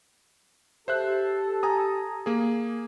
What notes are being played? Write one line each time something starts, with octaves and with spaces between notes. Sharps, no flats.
G4 A4 C5 E5 F#6
G#5 A#5 D#6
A#3 G#4